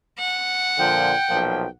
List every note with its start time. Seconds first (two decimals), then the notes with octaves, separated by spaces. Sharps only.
0.19 F#5
0.78 A#2 D3 F3 G5
1.28 B1 A#2 F3